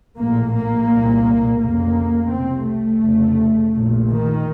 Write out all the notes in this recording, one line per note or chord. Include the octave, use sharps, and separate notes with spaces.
A#1 A2 A#3
A#3
C2 A#2
F1 F2 C#3 A#3
C2 C3 C4
A3
F1 F2 C#3
A#1 A#2
D#3